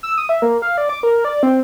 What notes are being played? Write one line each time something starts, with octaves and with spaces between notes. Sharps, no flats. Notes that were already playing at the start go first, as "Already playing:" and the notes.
E6
D#6
E5
A#3
F5
D5
D6
A#4
D5
C4